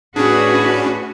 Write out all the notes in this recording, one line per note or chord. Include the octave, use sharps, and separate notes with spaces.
A2 C#4 D4 F#4 G#4 B4